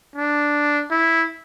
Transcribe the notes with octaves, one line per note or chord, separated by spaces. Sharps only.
D4
E4